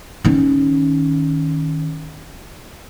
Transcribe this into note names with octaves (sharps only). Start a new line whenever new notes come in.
D#3 C#4